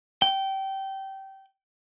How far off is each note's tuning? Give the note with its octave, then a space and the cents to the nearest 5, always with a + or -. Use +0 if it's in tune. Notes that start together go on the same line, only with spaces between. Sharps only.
G5 -20